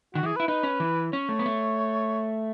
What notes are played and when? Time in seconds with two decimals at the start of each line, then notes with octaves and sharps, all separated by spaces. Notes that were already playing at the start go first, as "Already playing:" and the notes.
0.14 D#3 F#4
0.23 E3
0.26 G#4
0.36 B4
0.40 E4
0.48 D#4 B4
0.63 C#4
0.80 E3
1.13 C#4 C#5
1.29 A3
1.39 B3
1.46 A3